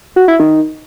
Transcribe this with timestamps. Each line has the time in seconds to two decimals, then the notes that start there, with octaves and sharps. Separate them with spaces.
0.16 F#4
0.28 E4
0.40 D#3